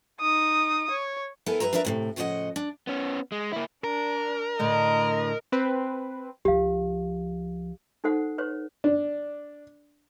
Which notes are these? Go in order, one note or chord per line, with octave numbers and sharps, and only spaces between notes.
D#4 D#6
C#5
B3 E4 A4 A#4 G#5
G2 F3 B4 E5 A#5
D4 A#4 B4 D5 E5 A#5
D2 A2 C3
A2 C#3 F3 F#4 D#5 F#5
D4
B3 C#4
G#3
A#3 E4
D4 A#4
A2 D3 D#5
C4 B4
C#2 F3 G4 F5
D#4 A4 C5 F#5
B4 C#5
D4